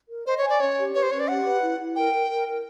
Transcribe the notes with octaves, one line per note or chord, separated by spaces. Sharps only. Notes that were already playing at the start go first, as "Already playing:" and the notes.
A#4
C5 D#5
C#5
G#5
D5
C#4 C#5
G4
B4 C#5
C5
C#4 C#5
D5
G4 F#5
B4
E4
E4
A#4 G5
A#4
A#4
A#4